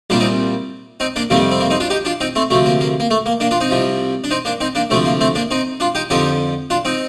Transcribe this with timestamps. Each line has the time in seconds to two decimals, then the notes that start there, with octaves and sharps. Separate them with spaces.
0.10 C2 A#2 G3 A#3 D4
0.20 C4 D#4
1.00 C4 D#4
1.16 A#3 D4
1.30 F2 C3 D#3 G3 A#3
1.51 C4
1.60 A#3
1.70 C4 D#4
1.80 D4 F4
1.90 D#4 G4
2.05 D4 F4
2.20 C4 D#4
2.35 A3 C4
2.50 D2 C3 F3 A3
2.66 A#3
2.81 A#3
3.00 A#3
3.11 A3
3.26 A#3
3.40 A#3 D4
3.51 D4 F4
3.61 C4 D#4
3.70 C2 C3 F3
4.24 D4
4.30 C4 D#4
4.45 A#3 D4
4.60 C4 D#4
4.75 A#3 D4
4.90 D2 C3 F3 A3 C4
5.05 A#3
5.21 A3 C4
5.35 A#3 D4
5.51 C4 D#4
5.80 D4 F4
5.95 D#4 G4
6.10 F2 D3 F3 D#4 G4
6.70 D4 F4
6.85 C4 D#4